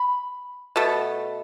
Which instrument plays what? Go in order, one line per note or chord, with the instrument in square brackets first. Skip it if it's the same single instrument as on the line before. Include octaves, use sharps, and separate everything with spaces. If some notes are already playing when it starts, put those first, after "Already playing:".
Already playing: [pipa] B5
B2 A3